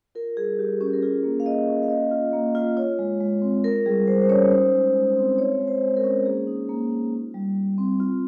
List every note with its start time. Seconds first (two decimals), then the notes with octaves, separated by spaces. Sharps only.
0.15 F4 A#4
0.37 G3 G#4
0.59 G3 G4
0.81 C#4 G4
0.93 A#4
1.02 F4 G#4
1.24 A#3
1.40 F5
1.46 A#3 D#5
1.68 C#4
1.83 F5
1.90 A#3 D#5
2.11 F4
2.33 A#3
2.55 F4
2.77 F4 C#5
2.99 G#3
3.21 G#3
3.42 C4
3.64 F4 A#4
3.86 G3 G#4
4.07 G3 C5
4.22 C5
4.29 C#4 C#5
4.51 D#4 C5
4.73 G#3
4.95 G#3
5.17 C4
5.38 F4 C#5
5.60 G#3
5.68 C5
5.82 G#3
5.96 A#4
6.04 C#4
6.25 A#3 G#4
6.47 D#4
6.69 A#3
6.91 D#4
7.12 F4
7.34 G3
7.56 G3
7.78 C4
8.00 F4